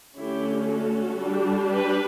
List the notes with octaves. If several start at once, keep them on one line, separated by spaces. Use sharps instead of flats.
D3 A3 C#4 E4 G4
F#4 A4
G3 D4
G4 B4